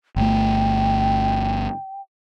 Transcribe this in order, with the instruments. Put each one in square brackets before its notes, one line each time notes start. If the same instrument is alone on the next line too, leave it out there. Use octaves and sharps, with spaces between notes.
[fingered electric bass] G1 A3 [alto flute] G5